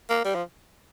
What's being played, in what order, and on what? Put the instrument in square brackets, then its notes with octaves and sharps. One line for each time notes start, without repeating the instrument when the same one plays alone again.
[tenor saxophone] A#3
G3
F3